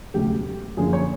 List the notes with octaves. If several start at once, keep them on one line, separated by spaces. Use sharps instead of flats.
E1 D2 C#3 F#3 A3 G4
F#2 D3 F3 A#3 G#4
C#5